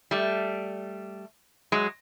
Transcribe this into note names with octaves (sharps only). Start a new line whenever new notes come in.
G3 A3
F#3 G#3